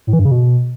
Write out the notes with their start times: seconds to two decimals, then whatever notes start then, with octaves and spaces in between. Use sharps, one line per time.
0.07 A2
0.13 E3
0.19 G2
0.25 C#3
0.31 B2